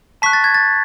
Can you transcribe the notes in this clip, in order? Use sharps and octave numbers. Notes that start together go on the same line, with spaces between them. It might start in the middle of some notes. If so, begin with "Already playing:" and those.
A5 C#6 F#6 B6
A6
G#6
A6